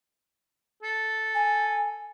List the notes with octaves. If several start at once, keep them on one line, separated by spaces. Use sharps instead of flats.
A4
G#5